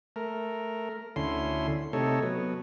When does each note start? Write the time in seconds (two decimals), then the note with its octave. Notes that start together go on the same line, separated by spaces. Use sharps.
0.16 A3 A#4
1.16 D2 D3 C#4 E4 C6
1.93 C3 A3 D#4 A4 C#5
2.23 F#3 B3